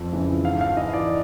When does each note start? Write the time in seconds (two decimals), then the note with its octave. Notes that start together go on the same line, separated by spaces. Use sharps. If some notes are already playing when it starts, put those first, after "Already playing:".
Already playing: F2
0.13 C#3 E3
0.44 G#2 F5
0.61 F5
0.77 E3 D#5
0.93 D5